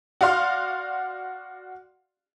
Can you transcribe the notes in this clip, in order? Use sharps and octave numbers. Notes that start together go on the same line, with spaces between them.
F#4 D5 F5 C6